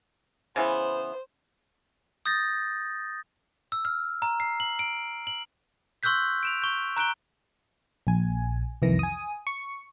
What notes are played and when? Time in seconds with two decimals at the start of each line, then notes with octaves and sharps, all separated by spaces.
0.56 C#3 E3 B3 C5
2.26 D#6 G6 A6 A#6
3.72 E6
3.85 F6
4.22 A#5
4.40 C7
4.60 F#7
4.79 D7
5.27 F#7
6.03 C6 C#6 E6 F#6 G6 B6
6.43 D7 E7 F7
6.62 C#6 G6
6.97 A#5 F#6 D7 G7
8.07 A#1 G#5
8.82 C2 F2 D#3 E3 A#6
8.99 G#5 D#6
9.47 C#6